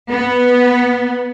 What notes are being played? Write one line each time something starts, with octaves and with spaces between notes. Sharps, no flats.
B3